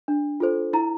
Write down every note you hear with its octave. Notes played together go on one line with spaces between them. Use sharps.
D4
F4 A4 C5
E4 A#5